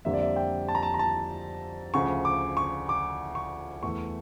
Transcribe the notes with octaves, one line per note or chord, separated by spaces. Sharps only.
F2 D3 G3 A#3 E5
D5
E5
G5
A5
A#5
A5
A#5
A5
D2 C#3 F3 C#6
D6
C#6
D6
C#6
E2 E3 A3 C#6